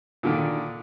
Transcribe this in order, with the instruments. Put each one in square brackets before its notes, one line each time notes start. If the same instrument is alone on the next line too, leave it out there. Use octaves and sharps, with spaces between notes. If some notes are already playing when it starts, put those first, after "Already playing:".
[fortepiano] A#2 D3 D#3